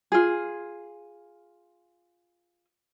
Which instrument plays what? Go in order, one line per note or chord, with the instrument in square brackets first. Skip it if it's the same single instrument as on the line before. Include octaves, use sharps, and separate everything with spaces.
[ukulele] F4 G#4